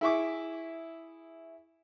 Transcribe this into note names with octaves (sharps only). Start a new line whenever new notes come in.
E4 G#4 E5 C#6 D6